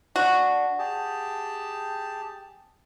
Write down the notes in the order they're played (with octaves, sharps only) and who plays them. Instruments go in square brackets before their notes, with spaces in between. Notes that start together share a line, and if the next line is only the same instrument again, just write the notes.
[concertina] D4 [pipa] F#4
[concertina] G4 G#4 A5